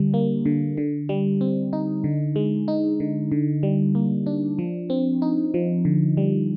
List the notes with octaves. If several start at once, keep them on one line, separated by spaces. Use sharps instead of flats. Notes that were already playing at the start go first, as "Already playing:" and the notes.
Already playing: D3 G3
A#3
D3
D3
G3
C4
D#4
D3
G#3
D#4
D3
D3
G3
A#3
D4
F3
C4
D#4
F3
D3
G3